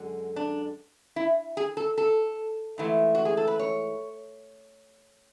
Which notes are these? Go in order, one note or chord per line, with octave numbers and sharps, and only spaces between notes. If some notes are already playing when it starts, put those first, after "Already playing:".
Already playing: F#2 D3 G#3
D4
E4
G#4
A4
A4
G#2 E3 A3
F#4
G#4
A4
B4
C#5